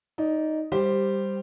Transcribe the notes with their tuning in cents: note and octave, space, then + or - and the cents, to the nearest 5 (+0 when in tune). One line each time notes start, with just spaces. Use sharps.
D#4 +0 D5 -20
G3 +10 G4 +0 C5 +0